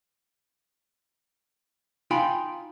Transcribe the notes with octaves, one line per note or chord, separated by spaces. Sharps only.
D#4 F4 F5 G5 G#5 B5